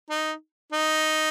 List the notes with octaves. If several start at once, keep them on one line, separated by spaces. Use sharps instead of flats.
D#4
D#4